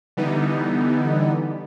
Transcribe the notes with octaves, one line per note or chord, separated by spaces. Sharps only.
D3 E3 G3 B3 D#4